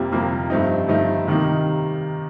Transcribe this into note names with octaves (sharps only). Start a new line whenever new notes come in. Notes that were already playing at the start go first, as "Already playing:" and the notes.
Already playing: F2 C3 G3 A#3 F4
F2 C3 G3 A#3 F4
G2 F3 A3 C4 D#4
G2 F3 A3 C4 D#4
C3 D#3 G3 A#3 D#4